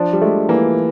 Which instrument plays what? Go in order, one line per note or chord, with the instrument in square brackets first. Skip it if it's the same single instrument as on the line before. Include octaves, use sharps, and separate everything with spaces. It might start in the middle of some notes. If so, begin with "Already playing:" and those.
Already playing: [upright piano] F3 [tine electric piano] D4
[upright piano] G3
[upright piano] G#3 [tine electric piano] A3
[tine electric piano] E3 [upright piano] A#3